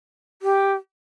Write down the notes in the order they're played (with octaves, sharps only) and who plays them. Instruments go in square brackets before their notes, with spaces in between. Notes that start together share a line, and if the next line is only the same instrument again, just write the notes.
[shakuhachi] G4